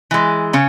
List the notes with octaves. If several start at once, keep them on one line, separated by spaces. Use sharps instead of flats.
E3 G#3
C#3 C#4